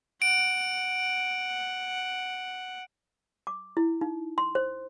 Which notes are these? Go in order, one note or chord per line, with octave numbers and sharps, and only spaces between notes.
F#5 D7
D6
E4
D#4
C6
C5